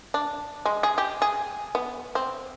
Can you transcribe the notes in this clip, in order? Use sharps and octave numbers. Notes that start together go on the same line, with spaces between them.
D4
G#3
G#4
G4
G#4
B3
C4